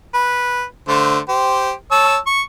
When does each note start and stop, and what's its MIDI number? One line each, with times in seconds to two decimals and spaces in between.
0.14 0.63 71
0.88 1.19 50
0.88 1.19 57
0.88 1.19 72
1.29 1.72 67
1.29 1.72 72
1.91 2.17 73
1.91 2.17 81
1.91 2.17 88
2.27 2.41 85